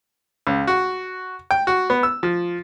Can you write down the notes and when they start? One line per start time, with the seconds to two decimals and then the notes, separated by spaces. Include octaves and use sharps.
0.47 C#2
0.67 F#4
1.51 G5
1.67 F#4
1.90 B3
2.03 E6
2.23 F3